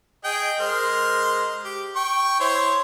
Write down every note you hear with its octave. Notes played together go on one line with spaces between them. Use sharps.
G#4 D#5 G5
G#3 A#4 C5
G4
G5 C#6
E4 C5 C#5